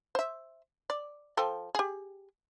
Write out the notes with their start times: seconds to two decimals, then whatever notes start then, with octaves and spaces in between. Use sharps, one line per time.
0.15 C5 E5
0.90 D5
1.37 F3 A4 G5
1.75 G4 G#4